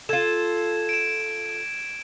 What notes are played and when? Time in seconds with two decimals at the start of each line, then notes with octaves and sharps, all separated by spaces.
0.09 F4 A4 G#6 E7
0.89 D7 E7